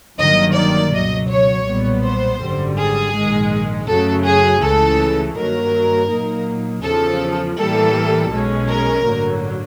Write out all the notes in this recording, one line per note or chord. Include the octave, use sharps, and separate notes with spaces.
G1 G2 D#3 F#3 A#3 D#5
D5
C#2 B2 F#3 D#5
C#5
B1 A#2 G3 B3
C5
G#1 F#2 D3 G3
G#4
A#1 G#2 D#3 G#3
F#2 C#3 F#3 A3 A4
G#4
C#2 C#3 E3 A3 A4
G2 D#3 F#3 A#3 A#4
A#2 F#3 A#3 D#4
E2 C#3 F3 A4
A2 E3 G3 A#3 A4
B1 B2 G#3 C#4
A#4
A1 G2 D3 F#3 A#3